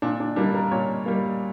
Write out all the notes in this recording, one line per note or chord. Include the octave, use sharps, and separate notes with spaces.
A#2 D4
D4
G3 A#3 D4
A#4
A#2 C#5
G3 A#3